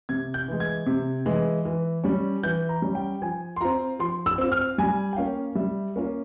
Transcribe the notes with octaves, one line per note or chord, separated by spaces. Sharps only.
C3 G#6
G6
E3 G#3
G#6
C3
E3 G#3
E3
G3 C#4
E3 G6
A#5
G3 C#4
G5
F3 G#5
C6
C4 F4 A#5
F3 C6
E6
C4 F4 E6
F6
G3 G#5
G5
A#3 C#4 F4 F5
G3 E5
A#3 C#4 F4